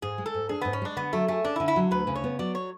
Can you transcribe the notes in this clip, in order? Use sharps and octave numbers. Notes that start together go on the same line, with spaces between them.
G#2 G#4
G#3
A4
G#2
D4 G#4
G#2 B3
C#4
G#3 D4
D3 B3
F#3 A3
A3 G#4
C#4 D4
E4
D3
E4
F#3
D2 B4
C#3
C#5
B3
F#3 D5
C#5